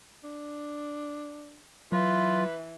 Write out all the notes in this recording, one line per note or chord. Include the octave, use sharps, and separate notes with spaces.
D4
E3 F#3 F4 B4